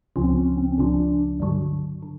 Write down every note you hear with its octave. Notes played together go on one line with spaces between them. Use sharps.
C#2 C#3 F3 C#4
C4
C#4
C4
C#4
C#2 C#3 F3 D4
G2 D3 F#3
D3